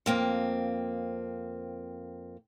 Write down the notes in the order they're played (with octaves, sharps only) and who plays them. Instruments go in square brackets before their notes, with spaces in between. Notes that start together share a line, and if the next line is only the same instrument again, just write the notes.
[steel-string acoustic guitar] F2 A#3 C4